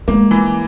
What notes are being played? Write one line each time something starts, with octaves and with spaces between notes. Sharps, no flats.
G#3 A#3
E3